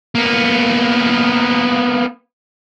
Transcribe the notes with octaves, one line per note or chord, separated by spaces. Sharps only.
A#3 B3